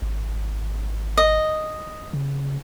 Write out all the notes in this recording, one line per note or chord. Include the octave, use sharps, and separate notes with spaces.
G#1
D#5
C#3